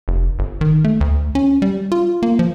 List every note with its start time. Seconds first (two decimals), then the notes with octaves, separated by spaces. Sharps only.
0.08 F1
0.39 G1
0.61 D#3
0.84 A3
1.01 D2
1.35 C#4
1.62 G3
1.92 F4
2.23 A#3
2.39 F3